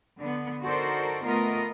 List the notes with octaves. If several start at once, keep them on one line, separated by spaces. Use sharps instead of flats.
D3 B3
D#4 F#4 A4 A#4 C5 D5
A3 B3 F4 A#4 D#5